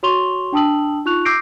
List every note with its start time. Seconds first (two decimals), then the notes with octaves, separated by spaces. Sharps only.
0.03 F#4 C#5 C6 C#6 F7 G7
0.52 D4 G5 A5 D#6 E6 F#7
1.06 D#4 F4 C#6 F#6 F7
1.25 D6 E6 G6 A#6 C7 D7